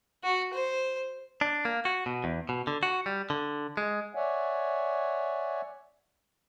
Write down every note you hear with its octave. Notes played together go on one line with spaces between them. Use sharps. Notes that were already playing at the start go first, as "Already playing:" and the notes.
F#4
C5
D4
A#3
F#4
B2
E2
B2
D3
F#4
G3
D3
G#3
C#5 D5 E5 F#5 G#5